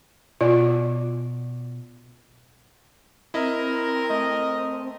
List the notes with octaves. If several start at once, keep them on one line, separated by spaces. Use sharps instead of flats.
B2 F4 D5
C4 E4 A#4 D#5
A3 D#5